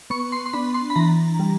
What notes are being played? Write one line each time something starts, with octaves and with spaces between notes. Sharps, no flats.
B3 C#6
C6
C6
D4 B5
C6
B5
E3 A#5
G3